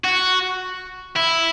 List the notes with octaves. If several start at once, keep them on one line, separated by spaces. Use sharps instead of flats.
F#4
E4